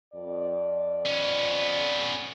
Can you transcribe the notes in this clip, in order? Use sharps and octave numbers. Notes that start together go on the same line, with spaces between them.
F2 D5
B3 C#4